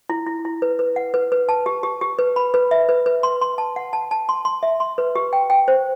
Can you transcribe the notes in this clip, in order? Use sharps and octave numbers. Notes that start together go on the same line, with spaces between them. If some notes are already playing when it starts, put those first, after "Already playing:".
E4
E4
E4
B4
B4
F#5
B4
B4
A5
G4
G4
G4
B4
B5
B4
E5
B4
B4
C6
C6
A5
F#5
A5
A5
C6
C6
E5
C6
B4
G4
G5
G5
C5